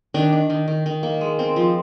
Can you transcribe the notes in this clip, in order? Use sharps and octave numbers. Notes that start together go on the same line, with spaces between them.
D#3 D4
D4
D#3
D#3
D#3
A#3
G#3
C4
F3